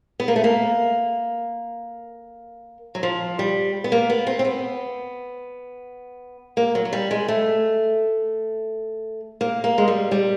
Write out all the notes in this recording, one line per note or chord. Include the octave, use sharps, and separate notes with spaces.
B3
A#3
A3
A#3
F#3
F3
G3
B3
A#3
B3
C4
C4
B3
A#3
F#3
F#3
G3
G#3
A3
A#3
A#3
G#3
G3
G3